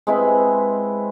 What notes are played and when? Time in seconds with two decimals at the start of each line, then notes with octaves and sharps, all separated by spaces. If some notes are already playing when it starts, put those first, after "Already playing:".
0.07 G#3 C4 E4 B4